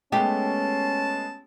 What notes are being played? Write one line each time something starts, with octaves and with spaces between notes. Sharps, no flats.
G#3 A3 B3 C#4 G4 A5